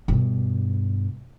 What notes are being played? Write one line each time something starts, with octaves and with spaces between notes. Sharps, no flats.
G2 B2